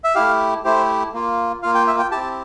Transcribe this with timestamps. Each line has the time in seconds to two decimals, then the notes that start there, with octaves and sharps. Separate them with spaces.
0.04 E5
0.15 A3 E4 G4 F5
0.64 A3 E4 G4 C5
1.14 A#3 F4
1.63 A#3 F4 F5
1.74 G5
1.87 E5
1.99 G5
2.11 C4 E4 G4 A5